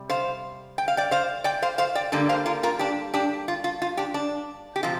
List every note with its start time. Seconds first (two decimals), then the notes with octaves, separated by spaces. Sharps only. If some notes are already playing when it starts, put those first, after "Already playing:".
Already playing: C3 G3
0.09 C5 F5
0.78 G5
0.88 F5
0.97 D5 G5
1.11 C5 F5
1.44 D5 G5
1.62 C5 F5
1.78 C5 F5
1.95 D5 G5
2.12 G2 D3 G3 A#3 D4
2.29 C5 F5
2.46 F4 A#4
2.63 F4 A#4
2.79 D4 G4
3.14 D4 G4
3.48 F4
3.64 F4
3.82 F4
3.97 D4 G4
4.14 D4
4.76 G4
4.83 C3 F3 F4